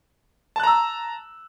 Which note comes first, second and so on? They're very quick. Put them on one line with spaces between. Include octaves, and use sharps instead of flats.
A5 F#6 A#5 E6